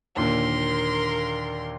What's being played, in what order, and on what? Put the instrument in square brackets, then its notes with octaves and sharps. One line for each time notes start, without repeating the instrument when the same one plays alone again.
[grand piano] D#2 A#2 D3 [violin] A#4 C6